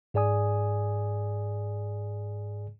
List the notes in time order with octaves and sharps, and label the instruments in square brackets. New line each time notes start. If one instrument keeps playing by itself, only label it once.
[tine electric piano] G#2 G#4 D5 G#5 D#6